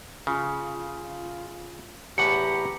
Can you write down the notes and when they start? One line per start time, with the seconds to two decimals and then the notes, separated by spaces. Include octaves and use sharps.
0.27 C#3 F4
2.18 E2 A2 G4 F#5 A#5 C#7